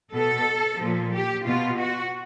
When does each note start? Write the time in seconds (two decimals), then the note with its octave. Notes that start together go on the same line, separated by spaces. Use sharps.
0.13 B2 A4
0.80 A#2 F3
1.13 G4
1.46 B2 F4
1.79 F#4